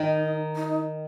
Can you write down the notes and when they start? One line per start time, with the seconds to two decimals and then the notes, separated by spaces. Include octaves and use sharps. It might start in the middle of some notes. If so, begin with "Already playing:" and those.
Already playing: D#3 D#4
0.56 D#4